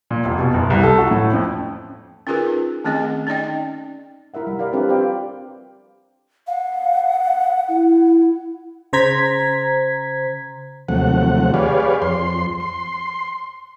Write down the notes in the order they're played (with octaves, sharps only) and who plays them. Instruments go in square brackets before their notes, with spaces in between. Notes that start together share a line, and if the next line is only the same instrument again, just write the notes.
[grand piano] A#2
F1
B2
F#1
C2
A4
F#4
A2
F2
[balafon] C#4 D#4 F4 G#4 A#4 B4
D#3 A3 C4 C#4 G#4 D#5
C#4 D#4 D5 D#5 G5
[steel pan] E4 A#4 E5 F#5
G3
A#4 D5 F5
C4 D4 E4 G4 A4 B4
F4 G4 C5 D5 F5 G5
[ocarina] F5 [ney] F#5
[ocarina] E4
[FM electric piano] C#3 C5 A#5 G#6 B6
[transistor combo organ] D#2 C3 F3 F#3 A3 F#5
G4 G#4 B4 C#5 D5 F5
F2 C6
C6